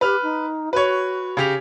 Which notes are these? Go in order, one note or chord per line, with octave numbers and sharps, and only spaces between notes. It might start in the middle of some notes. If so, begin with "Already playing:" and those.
G4 B4 F6
D#4
F#4 B4 C#5
C#3 G4 F7